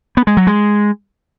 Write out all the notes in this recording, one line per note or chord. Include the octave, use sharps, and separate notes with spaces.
B3
G#3
F#3
G#3